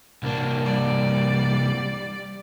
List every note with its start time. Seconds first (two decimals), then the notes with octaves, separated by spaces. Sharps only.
0.23 C2 A#3 D4
0.66 G3 D5